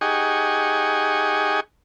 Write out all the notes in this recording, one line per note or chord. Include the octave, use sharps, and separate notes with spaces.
D#4 G4 G#4 F#5 G#5 C#6